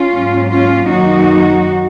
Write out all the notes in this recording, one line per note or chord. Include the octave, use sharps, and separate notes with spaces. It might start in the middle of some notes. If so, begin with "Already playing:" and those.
Already playing: C#4 F4
G#2 F#3 A#3
C#4 F4
F#2 D#3 F#3 A#3 D#4 F#4